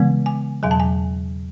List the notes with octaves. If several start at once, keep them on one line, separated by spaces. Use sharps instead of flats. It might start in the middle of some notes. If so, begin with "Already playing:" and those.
Already playing: C#3 E3 G#3 B3
G#5
E2 B2 F#3 G#5
A5
G#5